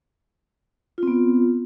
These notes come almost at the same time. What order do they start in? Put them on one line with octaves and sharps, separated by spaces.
F4 C4 B3